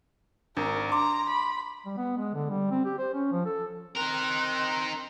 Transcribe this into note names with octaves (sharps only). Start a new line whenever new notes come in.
G#1 D4 A#4
A#5 C6 D6
B5
G3
B3
G#3
D3
G3
C4
G4
C5
C#4
F3
A4
C4 D#4 A#4 F#6